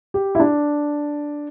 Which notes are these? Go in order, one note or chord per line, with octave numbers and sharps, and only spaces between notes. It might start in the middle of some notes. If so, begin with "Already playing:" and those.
G4
E4
D4